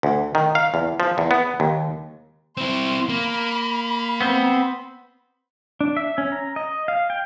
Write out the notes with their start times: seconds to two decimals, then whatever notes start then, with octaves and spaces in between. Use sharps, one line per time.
0.03 D2
0.35 D#3
0.55 F5
0.74 E2
1.00 F3
1.18 E2
1.31 B3
1.60 D#2
2.57 C4 E4 C6
3.09 A#3 B5
4.21 B3 C4 C5
5.81 D4
5.97 E5
6.18 C#4
6.32 A#5
6.56 D#5
6.88 F5
7.10 G5